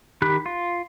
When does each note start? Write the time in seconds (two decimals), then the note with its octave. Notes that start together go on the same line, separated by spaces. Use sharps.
0.22 D#3 G4 B5 F#6
0.46 F4